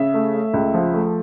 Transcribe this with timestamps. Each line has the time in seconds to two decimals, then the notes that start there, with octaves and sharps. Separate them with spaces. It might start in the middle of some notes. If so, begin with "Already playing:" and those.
Already playing: C#3 E5
0.14 A3
0.34 A3
0.54 C#2
0.74 F3
0.94 A3